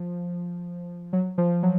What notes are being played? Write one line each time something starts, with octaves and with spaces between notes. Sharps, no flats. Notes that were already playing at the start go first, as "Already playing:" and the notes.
Already playing: F3
F#3
F3
F#3